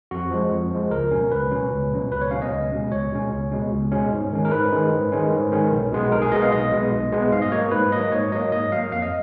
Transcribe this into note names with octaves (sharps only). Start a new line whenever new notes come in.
F2 F#4
F3 G#3
F2
F3 G#3
C#2 A#4
B2 F#3 C#4
C#2 B4
B2 F#3 C#4
C#2
B2 F#3 C#4
C#2 B4
C#5
B2 F#3 C#4 F5
D#5
C#2
B2 G#3 C#4
C#2 C#5
B2 G#3 C#4
C#2
B2 G#3 C#4
C#2
B2 G#3 C#4
G#2
D#3 G#3 C#4
A#4
G#2 B4
D#3 G#3 C#4
G#2
D#3 G#3 C#4
G#2
D#3 G#3 C#4
B1
B2 G#3 B3
B1 A#4
G#4
B2 G#3 B3 D#5
F5
B1 D#5
B2 G#3 B3
B1
B2 G#3 B3
G#2 F5
D#5
F#3 A#3 C#5
G#2 B4
F#3 A#3 D#5
G#2 C#5
F#3 A#3 D#5
G#2 D#5
F#3 A#3 F5
F2 F5
D#5